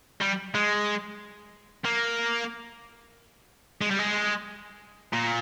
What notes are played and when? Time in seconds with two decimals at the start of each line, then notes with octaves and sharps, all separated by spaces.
0.21 G3
0.55 G#3
1.85 A#3
3.81 G#3
3.91 G3
3.99 G#3
5.13 A#2